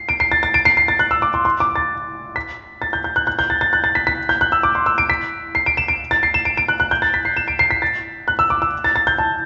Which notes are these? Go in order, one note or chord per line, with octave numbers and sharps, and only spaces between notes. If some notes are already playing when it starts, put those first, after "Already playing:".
Already playing: C7
D7
C7
A6
A6
D7
C7
C7
A6
F#6
E6
D6
C6
C6
D6
A6
B6
A6
G6
G6
F#6
F#6
G6
A6
A6
F#6
A6
B6
B6
G6
F#6
E6
D6
C6
E6
D7
B6
C7
D7
E7
D7
A6
C7
E7
D7
D7
F#6
F#6
G6
A6
B6
C7
E7
D7
C7
B6
A6
F#6
E6
D6
E6
A6
A6
G6
A5